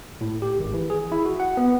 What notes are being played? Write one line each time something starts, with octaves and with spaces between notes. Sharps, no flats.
A2
G4
G#1
E3
G#4
E4
F#4
F#5
B3